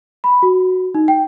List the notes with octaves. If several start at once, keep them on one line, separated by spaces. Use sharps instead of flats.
B5
F#4
D#4
G5